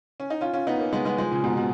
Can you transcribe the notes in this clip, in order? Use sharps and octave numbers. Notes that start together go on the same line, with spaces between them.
C#4
D#4
C#4 F4
C#4 F4
B3 D#4
A#3 C#4
G#3 B3
G#3 B3
F3 G#3
A#2 C#3
G#2 B2
B2